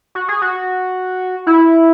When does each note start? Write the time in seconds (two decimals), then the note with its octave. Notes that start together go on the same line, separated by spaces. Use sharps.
0.15 F#4
0.29 G#4
0.42 F#4
1.47 E4